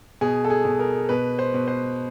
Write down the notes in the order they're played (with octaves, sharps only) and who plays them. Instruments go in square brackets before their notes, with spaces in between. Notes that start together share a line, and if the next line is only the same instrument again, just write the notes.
[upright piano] B2 G#4
A4
G#4
B2
A#4
B2 B4
C5
B2
C5